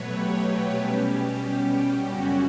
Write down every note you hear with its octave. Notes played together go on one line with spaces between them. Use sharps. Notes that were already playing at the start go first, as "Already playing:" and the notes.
Already playing: B2 F#3 A3 B4 C#5
G4
B2 G3 C#4
F#2 C#3 G3 C#4 F#4